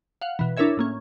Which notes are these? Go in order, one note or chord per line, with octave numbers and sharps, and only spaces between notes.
F5 F#5
B2 E3
D4 E4 A#4 C#5 E5 G#6
A2 A#3 C#4